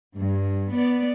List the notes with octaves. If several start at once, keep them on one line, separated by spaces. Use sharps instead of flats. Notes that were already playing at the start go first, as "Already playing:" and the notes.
G2
B3 D5